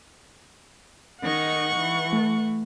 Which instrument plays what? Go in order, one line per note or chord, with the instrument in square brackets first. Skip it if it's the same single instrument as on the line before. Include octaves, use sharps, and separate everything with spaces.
[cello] D#3 D#4 [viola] F#5 C#6
[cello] E3
[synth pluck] A3